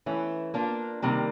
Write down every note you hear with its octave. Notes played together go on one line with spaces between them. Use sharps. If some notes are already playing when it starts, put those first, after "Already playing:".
E3 A3 C#4 E4
A#3 D4 F4
C3 D#3 G3 A#3